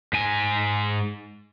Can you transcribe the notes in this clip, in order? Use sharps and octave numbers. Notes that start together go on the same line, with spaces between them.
G#2 G#5